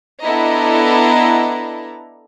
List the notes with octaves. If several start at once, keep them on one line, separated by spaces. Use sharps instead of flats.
B3 D4 E4 A4 D#5 A#5